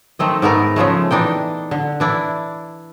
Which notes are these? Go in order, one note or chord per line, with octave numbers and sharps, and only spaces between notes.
D#3 A3 C4 D#5
G#2 A3 B3 A#4
C#3 F3 G#3 A3
E3 D4 D#4 G5
D3
E3 D4 E4